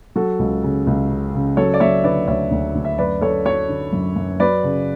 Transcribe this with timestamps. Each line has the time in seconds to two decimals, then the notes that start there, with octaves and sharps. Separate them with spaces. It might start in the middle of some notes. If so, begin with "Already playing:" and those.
0.16 F#3 F#4 A4
0.39 C#2
0.63 C#3
0.87 C#2
1.10 C#3
1.34 C#3
1.57 F#3 A4 C#5
1.74 D5
1.80 F#3 C#5 E5
2.04 D3 B4 D5
2.27 D2 C#5 E5
2.51 D2
2.75 D2
2.85 E5
2.98 F#2 B4 D5
3.21 F#2 A4 C#5
3.45 F#3 A4 C#5
3.69 D3
3.93 F#2
4.16 F#2
4.40 F#3 B4 D5
4.63 C#3